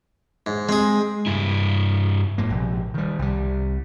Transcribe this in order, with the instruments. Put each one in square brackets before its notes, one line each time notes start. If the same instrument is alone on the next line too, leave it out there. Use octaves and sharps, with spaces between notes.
[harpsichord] G#2
[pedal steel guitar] G#3 [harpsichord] C4 G#4
[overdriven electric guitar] G2 E4
[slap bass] G#2 A#3
A#1 C3
D#3 G3
C2 G3